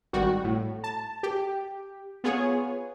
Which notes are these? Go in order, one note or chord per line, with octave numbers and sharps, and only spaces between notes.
G#1 G3 F#4
A2
A5
G4
B3 F4 G#4 C#5